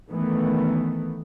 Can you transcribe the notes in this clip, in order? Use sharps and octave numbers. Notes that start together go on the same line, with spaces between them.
D#3 E3 A3 B3